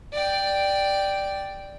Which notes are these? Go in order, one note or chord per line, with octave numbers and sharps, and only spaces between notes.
D5 G5